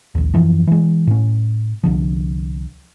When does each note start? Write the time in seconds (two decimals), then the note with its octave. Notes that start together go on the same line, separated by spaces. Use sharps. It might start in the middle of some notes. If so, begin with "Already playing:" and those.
0.15 A#1 D#2
0.34 F#2 E3 F3
0.67 E3 G#3
1.07 A2 C#4
1.84 C2 D3 F3